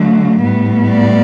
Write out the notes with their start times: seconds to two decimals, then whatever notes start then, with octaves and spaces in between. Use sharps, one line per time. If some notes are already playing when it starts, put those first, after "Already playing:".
Already playing: D3 F#3 A3
0.43 A2 G3 B3
0.89 D5